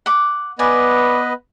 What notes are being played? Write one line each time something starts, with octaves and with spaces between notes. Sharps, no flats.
F#5 D6
B3 B4 D5 D#5 G#5